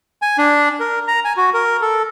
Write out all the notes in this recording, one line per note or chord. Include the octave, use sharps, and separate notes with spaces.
G#5
D4
A#4
A#5
G#5
F#4
A#4
A4